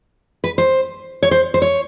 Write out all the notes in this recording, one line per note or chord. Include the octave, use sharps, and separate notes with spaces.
B4
C5
C#5
C5
C5
C#5